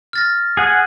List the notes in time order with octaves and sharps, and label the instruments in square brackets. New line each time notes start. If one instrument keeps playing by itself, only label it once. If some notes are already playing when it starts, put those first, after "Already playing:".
[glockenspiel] F6 A6 A#6
[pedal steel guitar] G#4 F#5 G#5